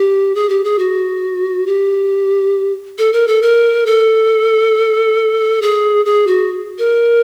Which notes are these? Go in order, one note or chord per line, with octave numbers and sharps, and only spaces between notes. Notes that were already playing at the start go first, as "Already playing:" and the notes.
Already playing: G4
G#4
G4
G#4
F#4
G4
A4
A#4
A4
A#4
A4
G#4
G#4
F#4
A#4